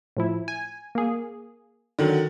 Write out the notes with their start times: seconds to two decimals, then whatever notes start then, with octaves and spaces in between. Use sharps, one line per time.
0.17 A2 F3 E4
0.48 G#5
0.95 A#3 G#4
1.99 D3 D#3 F#3